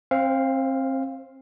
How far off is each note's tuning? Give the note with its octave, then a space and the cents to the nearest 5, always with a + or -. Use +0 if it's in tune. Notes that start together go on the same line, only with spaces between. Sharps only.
C4 +30 C5 -5 F5 +0